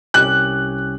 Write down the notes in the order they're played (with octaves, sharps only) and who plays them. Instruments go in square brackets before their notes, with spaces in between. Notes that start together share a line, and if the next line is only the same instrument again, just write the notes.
[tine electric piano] C2 C#4 G4 [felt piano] F#6